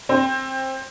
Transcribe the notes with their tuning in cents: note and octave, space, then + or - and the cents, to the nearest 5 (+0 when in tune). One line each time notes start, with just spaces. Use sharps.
C4 +15